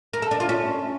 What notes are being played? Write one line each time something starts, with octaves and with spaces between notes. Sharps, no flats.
A#4
A4
D4
F4
C#4